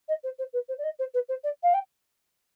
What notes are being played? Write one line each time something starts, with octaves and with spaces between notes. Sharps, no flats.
D#5
C5
C5
B4
C5
D5
D#5
C5
B4
C5
D5
F5
G5